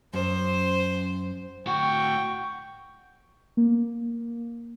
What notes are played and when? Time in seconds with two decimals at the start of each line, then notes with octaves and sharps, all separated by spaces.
0.14 F#2 C5
1.67 A2 F#4 G5 C#6
3.57 A#3